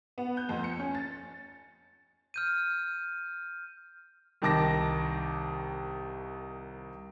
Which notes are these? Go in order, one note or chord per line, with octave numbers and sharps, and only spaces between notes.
B3
G6
F2
C#7
C#4
A6
F6 G6 D#7
C2 D#3 A5 D6 A#6